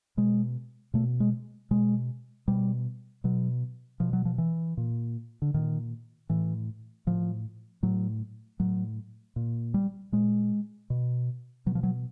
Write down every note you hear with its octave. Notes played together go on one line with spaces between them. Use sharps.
B2 G#3
B2 A3
G#3
B2 G#3
B2 G3
B2 F#3
B2 F3
F#3
F3
E3
A#2
D3
A#2 D#3
A2 E3
A2 F3
A2 F#3
A2 F#3
A#2
G3
A#2 G#3
B2
B2 F#3
F3
F#3